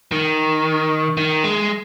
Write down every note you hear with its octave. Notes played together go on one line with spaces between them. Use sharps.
D#3
D#3
G#3